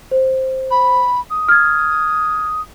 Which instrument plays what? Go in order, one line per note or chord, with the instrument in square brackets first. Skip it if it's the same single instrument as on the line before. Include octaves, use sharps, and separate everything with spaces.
[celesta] C5
[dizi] B5
D#6
[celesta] F6 G#6